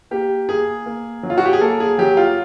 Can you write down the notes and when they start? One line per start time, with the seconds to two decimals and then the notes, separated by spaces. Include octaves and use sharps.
0.11 A#3 G4
0.49 A#3 G#4
0.86 A#3
1.23 F#3
1.30 F4
1.38 F#4
1.45 G4
1.53 G#4
1.61 A#3 A4
1.80 G#4
1.98 F#3 G4
2.17 F4